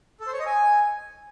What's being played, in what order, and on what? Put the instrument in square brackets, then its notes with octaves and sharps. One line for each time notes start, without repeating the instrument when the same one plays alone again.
[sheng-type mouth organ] A4
C5
C#5
D#5
G#5